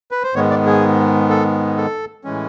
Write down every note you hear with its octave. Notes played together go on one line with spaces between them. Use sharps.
B4
C5
G#2 D#3 G#3 B3 C#5
D5
G#4
A4
A4
A2 E3 G#3 C#4